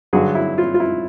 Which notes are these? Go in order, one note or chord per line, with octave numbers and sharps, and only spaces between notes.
G2 D3 F#3 F#4 G#4
E4
F4
F4
E4